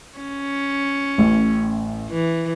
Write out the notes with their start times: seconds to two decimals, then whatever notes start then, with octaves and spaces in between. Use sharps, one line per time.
0.18 C#4
1.18 A1 A2
2.11 E3